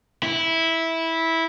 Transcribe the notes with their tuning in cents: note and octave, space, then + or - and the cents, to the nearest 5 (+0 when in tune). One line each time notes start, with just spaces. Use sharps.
E4 -10